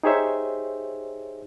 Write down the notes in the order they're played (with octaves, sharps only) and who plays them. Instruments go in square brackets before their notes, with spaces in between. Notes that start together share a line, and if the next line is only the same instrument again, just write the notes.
[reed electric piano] D#4 G4 G#4 C5 C#5 E5